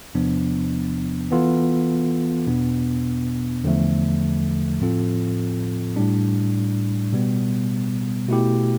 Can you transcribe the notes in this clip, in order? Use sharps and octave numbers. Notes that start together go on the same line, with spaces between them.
E2 C3 F3 B3 D4
E3 B3 F4 A4
E2 B2 B3 D4
E2 D3 F3 A3
A2 F3 C4 F4 A4
A2 G3 D4
B2 G3 B3
B2 A3 E4 G4